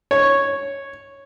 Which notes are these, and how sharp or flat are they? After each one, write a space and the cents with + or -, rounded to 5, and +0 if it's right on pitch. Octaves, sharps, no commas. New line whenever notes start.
C#5 -5